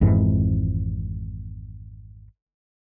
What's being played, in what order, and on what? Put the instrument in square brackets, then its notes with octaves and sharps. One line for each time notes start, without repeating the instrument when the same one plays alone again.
[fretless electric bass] G#1 F2 G#2 E3